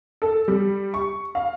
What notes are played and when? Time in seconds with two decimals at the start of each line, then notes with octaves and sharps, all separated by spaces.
0.22 A4
0.48 G3
0.94 C#6
1.35 F5